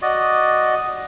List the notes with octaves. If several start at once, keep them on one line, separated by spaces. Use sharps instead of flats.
F#4 D5 D#5